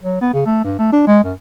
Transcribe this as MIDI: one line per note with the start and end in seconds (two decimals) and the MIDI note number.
0.02 0.21 54
0.21 0.31 59
0.34 0.41 49
0.46 0.64 57
0.64 0.76 43
0.79 0.91 57
0.93 1.05 62
1.07 1.23 56
1.24 1.33 42